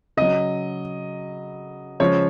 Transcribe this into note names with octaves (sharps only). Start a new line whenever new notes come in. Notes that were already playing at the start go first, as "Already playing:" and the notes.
C#3 F#3 D#5
C#3 F3 G#3 C#5